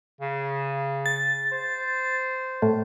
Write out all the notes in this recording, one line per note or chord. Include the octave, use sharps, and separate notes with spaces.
C#3
A6
C5
A2